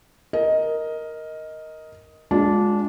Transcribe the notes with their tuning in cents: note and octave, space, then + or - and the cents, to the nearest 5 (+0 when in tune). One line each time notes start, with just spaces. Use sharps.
A#4 +0 D#5 +10
G#3 +0 D4 -15 F4 +35